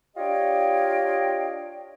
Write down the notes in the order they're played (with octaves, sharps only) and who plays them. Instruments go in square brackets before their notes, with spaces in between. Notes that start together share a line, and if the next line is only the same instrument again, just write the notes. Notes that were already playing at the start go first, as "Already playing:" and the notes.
[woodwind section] D4 F4 G4 C#5 D#5 G5